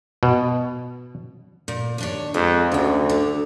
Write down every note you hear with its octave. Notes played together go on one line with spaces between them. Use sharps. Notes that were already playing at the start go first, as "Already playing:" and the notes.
B2
A#2
D#2 D4 C#5
F2 G#3
D2 C#3 F#4
D3